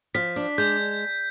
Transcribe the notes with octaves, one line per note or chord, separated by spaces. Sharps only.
F3 B6
D4
G#3 G6